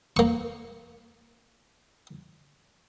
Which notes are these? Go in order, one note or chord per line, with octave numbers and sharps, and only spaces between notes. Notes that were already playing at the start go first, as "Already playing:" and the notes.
A#3 C#6